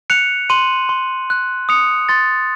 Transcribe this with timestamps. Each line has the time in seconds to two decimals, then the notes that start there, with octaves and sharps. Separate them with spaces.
0.10 F#6 C#7 F7
0.50 C6 D#7 F#7
0.89 C6
1.30 F#6
1.69 D#6 C#7 F7
2.09 C6 A6